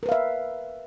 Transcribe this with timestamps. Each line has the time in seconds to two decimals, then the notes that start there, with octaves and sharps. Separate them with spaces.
0.03 A#4
0.06 B4
0.09 F5
0.12 E5